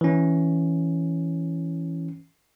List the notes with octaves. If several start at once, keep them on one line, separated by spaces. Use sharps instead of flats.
E3 C#4